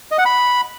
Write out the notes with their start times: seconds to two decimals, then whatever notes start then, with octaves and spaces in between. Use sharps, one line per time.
0.11 D#5
0.18 F#5
0.26 B5